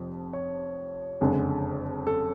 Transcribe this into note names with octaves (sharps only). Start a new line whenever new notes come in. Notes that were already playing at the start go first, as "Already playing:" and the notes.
Already playing: F1 F2 F3
C#5
F#1 F2 D3 G#3
A4